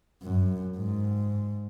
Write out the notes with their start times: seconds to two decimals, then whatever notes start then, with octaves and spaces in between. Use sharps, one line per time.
0.23 F#2
0.78 G#2